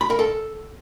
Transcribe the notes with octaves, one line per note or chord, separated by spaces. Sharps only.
B5
A#4
A4